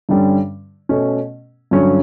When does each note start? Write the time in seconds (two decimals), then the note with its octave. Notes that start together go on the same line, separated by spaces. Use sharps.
0.09 G2 D3 G3 C#4
0.89 B2 A3 C#4
1.71 G2 D3 F#3 C#4